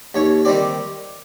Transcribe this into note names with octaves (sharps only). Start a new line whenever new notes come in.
D#2 C#5
D#3 G3 C4 D5